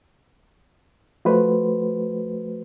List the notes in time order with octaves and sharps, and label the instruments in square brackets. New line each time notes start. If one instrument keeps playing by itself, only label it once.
[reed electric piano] F3 A3 F#4 B4 C5